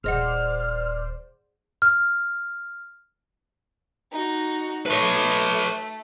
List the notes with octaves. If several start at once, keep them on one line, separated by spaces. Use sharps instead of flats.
D#1 G#4 C5 D5 D#5 F#5 F6
F6
D#4 F#4
A3 B4 C#5